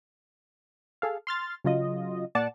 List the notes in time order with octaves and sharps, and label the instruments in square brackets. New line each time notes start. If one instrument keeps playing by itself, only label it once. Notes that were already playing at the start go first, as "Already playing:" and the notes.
[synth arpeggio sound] G#4 A4 F5
C6 F6 A6
C#3 F#3 F4 D#5
A#2 D5 F#5 A5